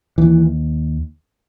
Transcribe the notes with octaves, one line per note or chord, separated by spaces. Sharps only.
D#2 E3